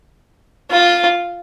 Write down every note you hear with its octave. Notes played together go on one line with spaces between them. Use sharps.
F4